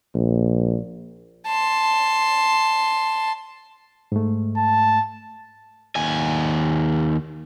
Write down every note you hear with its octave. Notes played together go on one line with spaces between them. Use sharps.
A#1
A5 C6
G#2 A3
A5
D#2 G#5